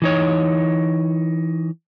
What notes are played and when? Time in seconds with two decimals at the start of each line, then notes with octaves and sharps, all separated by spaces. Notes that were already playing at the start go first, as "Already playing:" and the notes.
0.02 E3 D#4 C#5